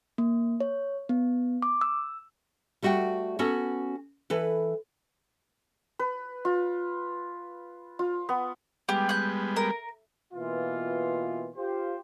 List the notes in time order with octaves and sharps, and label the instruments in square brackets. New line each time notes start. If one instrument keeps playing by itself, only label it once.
[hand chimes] A#3
C#5
B3
D6
E6
[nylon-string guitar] G3 A3 F#4 F#5 G5
B3 C#4 F#4 A4
E3 A4 B4
[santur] B4
F4
F4
B3
[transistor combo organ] G3 G#3 B3 [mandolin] G4
[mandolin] F#6 G6
A#4
[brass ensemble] B2 E3 A#3 F4
F4 G4 C5